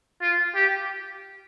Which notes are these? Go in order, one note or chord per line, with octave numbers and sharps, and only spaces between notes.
F4
G4